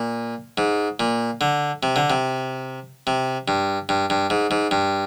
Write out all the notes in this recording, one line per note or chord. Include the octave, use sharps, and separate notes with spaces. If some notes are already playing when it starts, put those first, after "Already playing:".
Already playing: A#2
G#2
A#2
D3
C3
D3
C3
C3
G2
G2
G2
G#2
G#2
G2